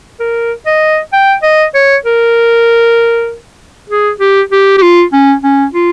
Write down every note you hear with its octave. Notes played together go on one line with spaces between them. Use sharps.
A#4
D#5
G5
D#5
C#5
A#4
G#4
G4
G4
G4
F4
C#4
C#4
F4